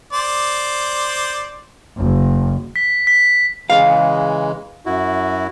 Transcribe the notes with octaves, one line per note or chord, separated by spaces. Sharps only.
C5 D5
F#1
B6
B6
C#3 E3 G#3 F5
F#2 E4 F#4